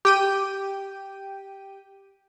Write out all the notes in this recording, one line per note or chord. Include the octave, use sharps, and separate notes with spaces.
G4 G5 D#7